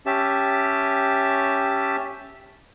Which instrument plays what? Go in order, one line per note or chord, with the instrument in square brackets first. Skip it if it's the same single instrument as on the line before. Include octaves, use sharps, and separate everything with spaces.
[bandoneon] C#4 G4 E5 A5